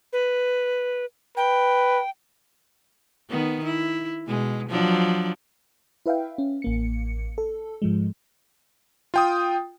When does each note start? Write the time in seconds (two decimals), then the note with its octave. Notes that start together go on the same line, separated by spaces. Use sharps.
0.13 B4
1.37 B4 G5
3.30 D#3 B3
3.64 E4
4.27 B2 G#3
4.69 F3 F#3 D4
6.06 E4 B4 E5 F5 G5
6.38 C#4
6.62 A1 A#3 C#7
7.38 A4
7.82 G#2 F3 G#3
9.14 F4 G5 D#6